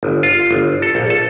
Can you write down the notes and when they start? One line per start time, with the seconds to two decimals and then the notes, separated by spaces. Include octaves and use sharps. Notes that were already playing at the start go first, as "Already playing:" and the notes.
0.03 G1
0.23 F4
0.51 G1
0.82 A4
0.95 A#1
1.10 A4